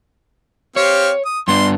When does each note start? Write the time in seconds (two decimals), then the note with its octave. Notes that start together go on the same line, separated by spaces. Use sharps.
0.76 C4 G4 C#5 F5
1.25 D#6
1.48 G2 B3 D4 C6